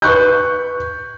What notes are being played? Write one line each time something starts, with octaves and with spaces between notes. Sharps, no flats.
B4 C#6 F#6 G6